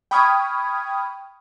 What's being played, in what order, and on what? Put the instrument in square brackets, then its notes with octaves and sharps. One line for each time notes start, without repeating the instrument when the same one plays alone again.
[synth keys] G5 B5 C#6 D#6 F6 G#6